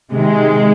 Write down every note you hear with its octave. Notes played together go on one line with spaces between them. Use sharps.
C3 D#3 G#3